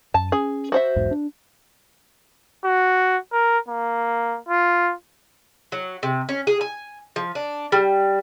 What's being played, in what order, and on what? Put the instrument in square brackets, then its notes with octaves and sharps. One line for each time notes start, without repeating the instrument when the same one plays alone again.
[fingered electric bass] F#2 [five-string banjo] A5
[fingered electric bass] C#4 [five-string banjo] G#4
[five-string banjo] F#4 C5 E5
[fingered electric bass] B1 E2 G#2
D4
[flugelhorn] F#4
A#4
A#3
F4
[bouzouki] F#3
C3
C#4
G#4
G#5
F3
D4
G3